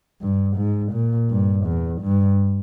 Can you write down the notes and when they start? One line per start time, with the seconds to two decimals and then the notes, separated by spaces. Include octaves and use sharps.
0.21 G2
0.57 G#2
0.92 A#2
1.30 G2
1.65 E2
2.02 G2